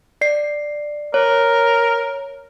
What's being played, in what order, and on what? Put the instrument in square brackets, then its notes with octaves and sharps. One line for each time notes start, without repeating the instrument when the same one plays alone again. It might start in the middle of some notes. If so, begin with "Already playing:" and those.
[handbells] D5 C7
[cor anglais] A#4 [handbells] C#5